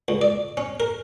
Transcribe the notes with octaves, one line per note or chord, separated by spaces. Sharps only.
C#2
D5
C#4
A#4